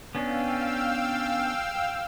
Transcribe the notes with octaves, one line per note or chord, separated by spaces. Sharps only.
B3 C#4 D4 F5 G5 E6